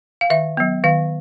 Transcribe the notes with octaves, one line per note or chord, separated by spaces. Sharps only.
F5
D#3 E5
F#3 B3
D#3 F5